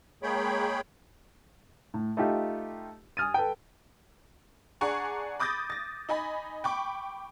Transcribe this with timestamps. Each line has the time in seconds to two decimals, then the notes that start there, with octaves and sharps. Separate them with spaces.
0.23 G#3 A#3 G#4 C#5 G5 B5
1.94 A2
2.17 A3 D#4 F4 G4
3.17 G#5 D#6 F6 A6 D#7
3.34 A4 B4 G5
4.81 D4 G#4 F#5 G#5 A#5 C#6
5.40 B5 D6 D#6 G6 A6 A#6
5.70 A6 A#6
6.09 D#4 D#5 G#5 B5
6.64 G5 B5 C#6 D6